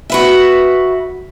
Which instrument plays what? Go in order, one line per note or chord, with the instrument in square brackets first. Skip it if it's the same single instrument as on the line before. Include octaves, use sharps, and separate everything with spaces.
[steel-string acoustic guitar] F#4 B4 E5